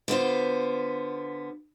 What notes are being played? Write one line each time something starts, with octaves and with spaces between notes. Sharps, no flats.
D3 B3 F4 C5